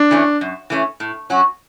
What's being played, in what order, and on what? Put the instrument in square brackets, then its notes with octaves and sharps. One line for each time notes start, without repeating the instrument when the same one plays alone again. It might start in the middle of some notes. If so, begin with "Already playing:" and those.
Already playing: [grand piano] D4
[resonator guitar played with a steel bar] E3 A3 C#4
F#2
E3 A3 C#4
A2
F#3 C#4 F#4